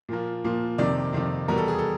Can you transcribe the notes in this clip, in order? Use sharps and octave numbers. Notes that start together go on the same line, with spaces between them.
A#2 F3 A#3
A#2 F3 A#3
F2 C3 D#3 D5
F2 C3 D#3
E2 B2 G3 B3 A#4
A4
G#4
A4